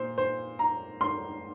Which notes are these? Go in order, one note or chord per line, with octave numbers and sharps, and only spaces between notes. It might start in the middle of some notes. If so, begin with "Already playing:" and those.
Already playing: A#2 C5
C5
A#5
C6